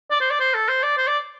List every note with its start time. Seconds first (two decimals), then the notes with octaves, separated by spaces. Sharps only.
0.11 D5
0.20 C5
0.30 D5
0.40 C5
0.54 A4
0.69 C5
0.83 D5
0.98 C5
1.07 D5